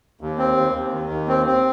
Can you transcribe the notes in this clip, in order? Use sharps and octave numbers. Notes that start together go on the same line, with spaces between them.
D#2
C4
D#2
D#2
D#3
D#2
C4
C4